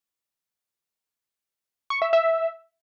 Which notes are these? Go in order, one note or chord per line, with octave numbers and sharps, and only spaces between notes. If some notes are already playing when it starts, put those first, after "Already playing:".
C#6
E5
E5